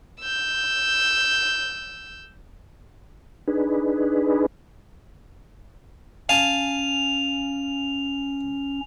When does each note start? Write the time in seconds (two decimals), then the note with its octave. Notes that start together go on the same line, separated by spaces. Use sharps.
0.20 E6 G6
3.48 D4 D#4 G#4 B4
6.29 C#4 F5 G#5 A5 F7